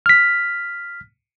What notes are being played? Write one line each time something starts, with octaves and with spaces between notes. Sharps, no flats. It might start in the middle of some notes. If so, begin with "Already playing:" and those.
F6 B6